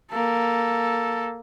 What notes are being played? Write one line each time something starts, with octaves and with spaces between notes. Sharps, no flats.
A#3 A4